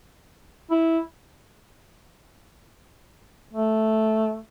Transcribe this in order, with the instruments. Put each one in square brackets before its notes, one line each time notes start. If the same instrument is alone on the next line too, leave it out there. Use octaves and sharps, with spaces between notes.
[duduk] E4
A3